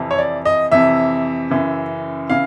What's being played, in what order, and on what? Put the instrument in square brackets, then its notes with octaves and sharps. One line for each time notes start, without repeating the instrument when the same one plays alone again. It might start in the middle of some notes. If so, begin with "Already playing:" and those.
Already playing: [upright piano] F2 C3 E3
C#5
D5
D#5
F2 C3 E3 E5
F#2 C#3 E3
C#3 E3 F5